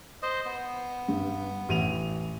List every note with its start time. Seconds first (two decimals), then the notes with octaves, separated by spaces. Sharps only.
0.23 C5 D#5
0.45 B3
1.08 G2
1.69 A1 D#7 F7